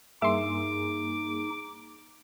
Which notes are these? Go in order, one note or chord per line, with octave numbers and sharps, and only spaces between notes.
G2 A#3 D#4 G#4 E5 C6 D6